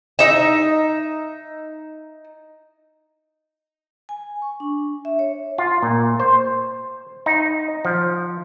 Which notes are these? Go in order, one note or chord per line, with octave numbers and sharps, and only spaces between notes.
D#4 E5
G#5
C#6
D4
E5
C#5
F4
A#2
C5
D#4
F3